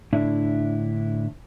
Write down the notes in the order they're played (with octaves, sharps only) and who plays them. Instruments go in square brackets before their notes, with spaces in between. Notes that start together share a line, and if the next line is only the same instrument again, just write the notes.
[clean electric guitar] A2 D3 D4 E4